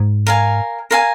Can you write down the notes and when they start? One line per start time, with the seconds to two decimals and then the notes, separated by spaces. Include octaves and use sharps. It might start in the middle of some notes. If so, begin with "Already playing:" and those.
Already playing: G#2
0.27 A#4 F5 G#5
0.91 A#4 F5 G#5